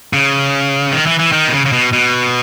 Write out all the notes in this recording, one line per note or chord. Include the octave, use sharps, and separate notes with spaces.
C#3
D#3
E3
E3
D#3
B2
C#3
C#3
B2
B2